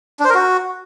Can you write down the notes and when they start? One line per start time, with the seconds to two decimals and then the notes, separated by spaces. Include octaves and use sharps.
0.20 D4
0.25 C5
0.30 A#4
0.35 F#4